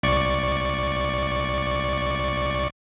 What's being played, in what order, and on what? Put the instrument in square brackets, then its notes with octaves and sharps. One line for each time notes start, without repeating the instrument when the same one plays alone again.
[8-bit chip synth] C2 D5 C#6